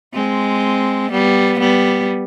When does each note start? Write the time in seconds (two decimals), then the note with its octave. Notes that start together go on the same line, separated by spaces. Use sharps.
0.14 G#3 C4
1.11 G3 B3
1.60 G3 B3